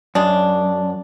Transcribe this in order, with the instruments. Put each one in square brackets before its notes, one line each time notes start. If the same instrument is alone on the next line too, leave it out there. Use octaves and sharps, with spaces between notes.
[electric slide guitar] F#2 [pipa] G#3 D4